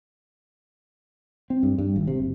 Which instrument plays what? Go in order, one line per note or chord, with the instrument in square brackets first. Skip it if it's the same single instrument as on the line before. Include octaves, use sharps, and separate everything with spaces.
[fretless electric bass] C4
G2
G2
G#1
C3
F#1